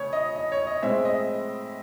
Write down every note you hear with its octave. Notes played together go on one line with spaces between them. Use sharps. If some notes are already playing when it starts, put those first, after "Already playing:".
Already playing: C#3 A3 C#5
D#5
D#5
C#5
D#5
A2 G#3 C4 E5
D#5